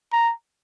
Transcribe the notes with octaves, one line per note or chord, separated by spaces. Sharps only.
A#5